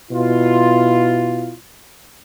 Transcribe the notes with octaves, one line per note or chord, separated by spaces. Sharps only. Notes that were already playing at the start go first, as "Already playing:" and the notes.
B2 E4 F4